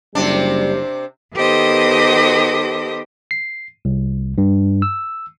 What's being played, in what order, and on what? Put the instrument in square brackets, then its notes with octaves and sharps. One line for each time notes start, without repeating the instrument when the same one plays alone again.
[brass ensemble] F#1 G3 [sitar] C3 C4 D4
[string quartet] D#3 B3 G4 A4 C5 D#5
[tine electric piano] C7
C2
G2
E6